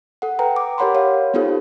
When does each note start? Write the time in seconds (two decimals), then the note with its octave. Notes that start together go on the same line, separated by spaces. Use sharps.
0.22 A4 F#5
0.39 B4 G5 A#5
0.56 D6
0.78 G4 A#4 C#5 F#5 B5 C6
0.95 C#5 F5
1.34 B3 D#4 F4 G4 A4 C5